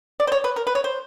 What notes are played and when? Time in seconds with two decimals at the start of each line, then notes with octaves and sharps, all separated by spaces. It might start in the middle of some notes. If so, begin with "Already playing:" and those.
0.20 D5
0.27 C5
0.32 C#5
0.44 B4
0.56 A#4
0.67 B4
0.75 C#5
0.84 C5